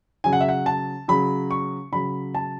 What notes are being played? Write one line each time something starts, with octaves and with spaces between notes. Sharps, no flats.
C#3 F#3 G#5
F#5
E5
F#5
A5
C#3 F#3 B5
C#6
C#3 F#3 B5
A5